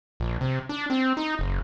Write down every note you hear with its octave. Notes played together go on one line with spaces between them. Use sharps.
A#1
C3
D4
C4
D#4
F#1